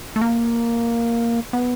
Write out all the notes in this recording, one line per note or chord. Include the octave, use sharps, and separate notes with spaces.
A3
A#3
B3